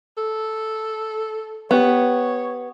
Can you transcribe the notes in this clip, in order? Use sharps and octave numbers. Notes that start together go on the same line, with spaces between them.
A4
B3 G4 C#5